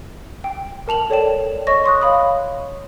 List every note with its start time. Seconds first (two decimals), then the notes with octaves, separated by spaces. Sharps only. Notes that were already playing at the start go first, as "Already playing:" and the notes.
0.44 G5
0.88 A#4 A5 F7 F#7
1.10 A4 C#5 D5 G5 E7
1.67 C#5 D#5 C#6 A#6
1.84 C6 C#6 D#6 F#6
2.02 C#5 F5 B5 D#6